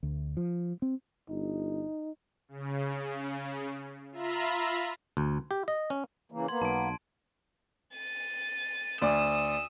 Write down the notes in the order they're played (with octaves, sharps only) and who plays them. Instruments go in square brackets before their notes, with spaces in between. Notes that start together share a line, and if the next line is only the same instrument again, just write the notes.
[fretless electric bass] D2
F3
C4
[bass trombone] G1 [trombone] D#4
[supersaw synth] C#3
F4 E5 A#5 B5
[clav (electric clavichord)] D2
G4
D#5
C#4
[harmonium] C#3 E3 A#3
[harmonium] A#3 B3 [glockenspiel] C6 G#6
[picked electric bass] B1 [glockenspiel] A5 D7
[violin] A6 D#7
[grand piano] D2 D5 [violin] D#6 E6